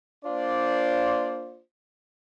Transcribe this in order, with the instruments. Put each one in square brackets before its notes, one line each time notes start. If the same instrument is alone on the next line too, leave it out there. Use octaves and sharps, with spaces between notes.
[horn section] A#3 D4 F4 C5 D5